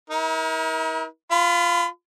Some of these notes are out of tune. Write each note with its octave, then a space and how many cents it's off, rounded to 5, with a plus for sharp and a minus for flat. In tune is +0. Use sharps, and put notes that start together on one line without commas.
E4 -45 A#4 +30
F4 -5 B5 +35